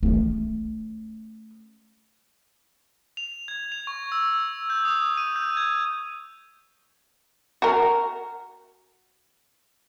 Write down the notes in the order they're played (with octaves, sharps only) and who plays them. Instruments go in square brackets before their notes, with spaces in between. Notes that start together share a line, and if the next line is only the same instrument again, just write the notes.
[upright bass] A3 C#4
[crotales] F7
G#6
F7
C#6
E6
G6
D#6
D#7
G6
G#6
[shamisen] F#4 A#4